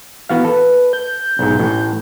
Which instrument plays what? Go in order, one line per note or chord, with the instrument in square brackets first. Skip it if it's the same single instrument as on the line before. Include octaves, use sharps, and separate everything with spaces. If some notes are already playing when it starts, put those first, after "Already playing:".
[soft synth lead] E3 [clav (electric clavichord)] B3 F#4 F5
[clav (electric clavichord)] A4 [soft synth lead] B4
[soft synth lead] G6
[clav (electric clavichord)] B1 G#2
A1 A2